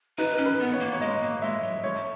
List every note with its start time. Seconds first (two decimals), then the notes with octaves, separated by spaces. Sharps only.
0.18 D#4 B4
0.38 C#4
0.46 B4
0.59 B3
0.73 C#5
0.80 A#3
0.93 C#5
1.01 G#3 D#5
1.21 A#3
1.42 G#3 E5
1.62 F#3
1.83 G#3 C#5